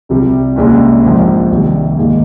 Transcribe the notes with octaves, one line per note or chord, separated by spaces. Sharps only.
C2 C3 G3
C2 A#2 G#3 C#4
A#1 G#2 F3 A#3
C2 C3 D#3 G3
G#2 D#3 A#3